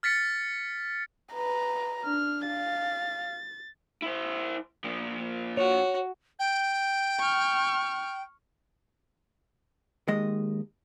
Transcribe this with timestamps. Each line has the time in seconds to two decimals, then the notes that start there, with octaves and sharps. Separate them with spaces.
0.03 F6 A6 B6 C#7
1.34 B4 A#5
2.05 D4 F6
2.47 F5 A6
4.02 E4 C5
4.84 A#2 F3
5.57 F#4 C#5
6.39 G5
7.19 C#6 F6
10.08 D#2 G#3 D#5